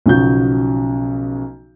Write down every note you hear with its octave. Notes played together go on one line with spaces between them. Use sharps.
B1 C#3 F3 F#4 G6